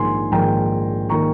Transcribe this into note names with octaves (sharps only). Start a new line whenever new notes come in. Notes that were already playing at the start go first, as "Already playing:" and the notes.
Already playing: A#1 G#2 D#3 A#3 G#5 C6
A#1 G#2 D#3 A#3 G5 A#5
D#3 A#3 A#5 C#6